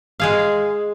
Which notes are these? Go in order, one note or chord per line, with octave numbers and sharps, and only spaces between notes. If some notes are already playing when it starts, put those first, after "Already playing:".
G#3 G#4 F5